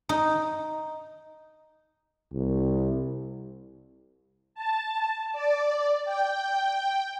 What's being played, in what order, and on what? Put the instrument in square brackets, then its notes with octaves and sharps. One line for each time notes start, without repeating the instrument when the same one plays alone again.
[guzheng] D#4
[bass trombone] C2
[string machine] A5
D5
G5